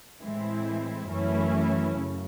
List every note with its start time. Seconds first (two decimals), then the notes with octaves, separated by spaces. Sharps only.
0.22 A2 E3 G#3 C4 E4
1.09 F#2 E3 A3 C#4 E4
1.97 F#2 C#3